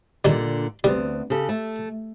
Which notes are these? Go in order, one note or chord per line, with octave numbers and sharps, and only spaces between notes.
A#2 D3 D#3 G3
D2 G3 B3 C4
C#3 G4 A4
A3